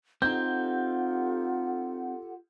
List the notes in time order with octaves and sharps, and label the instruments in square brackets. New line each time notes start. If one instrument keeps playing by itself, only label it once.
[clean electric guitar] C4 D#4 [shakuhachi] F4 [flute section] G4 A4 F#5 [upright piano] G6